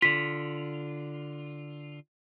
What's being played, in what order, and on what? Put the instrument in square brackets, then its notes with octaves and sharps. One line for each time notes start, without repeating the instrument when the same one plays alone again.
[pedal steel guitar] D3 F4 [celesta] B6